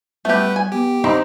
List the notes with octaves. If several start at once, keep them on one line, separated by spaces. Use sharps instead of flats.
G3 A3 B3 G4 B4
G#5
B3 G4
C4 D#4 D#5